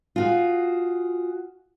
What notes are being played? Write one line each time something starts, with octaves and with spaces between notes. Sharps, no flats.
F4 F#4 G#4